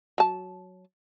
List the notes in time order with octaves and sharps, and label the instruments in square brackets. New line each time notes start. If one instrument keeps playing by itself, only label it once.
[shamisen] F#3 A5